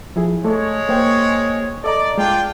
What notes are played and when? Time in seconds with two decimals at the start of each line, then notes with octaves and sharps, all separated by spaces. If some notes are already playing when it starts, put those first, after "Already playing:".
0.16 F3 E4 G#4
0.45 G#3 A3 A4 C#5
0.89 A#3 C5 G5
1.84 A4 D5 D#5 A#5
2.18 G#3 D4 F4 G5